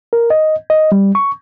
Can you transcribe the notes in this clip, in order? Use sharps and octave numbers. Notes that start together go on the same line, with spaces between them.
A#4
D#5
D#5
G3
C#6